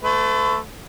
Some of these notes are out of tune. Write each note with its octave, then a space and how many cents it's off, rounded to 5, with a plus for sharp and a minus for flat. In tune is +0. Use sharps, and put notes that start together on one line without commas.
A3 +0 B4 +45